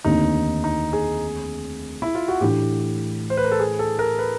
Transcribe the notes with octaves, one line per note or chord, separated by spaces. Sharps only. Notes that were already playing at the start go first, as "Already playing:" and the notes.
F1 D#2 D3 D#4
D#4
G#4
E4
F4
F#4
A2 E3 A3 D4 G4
C5
B4
A#4
A4
G#4
A4
A#4
B4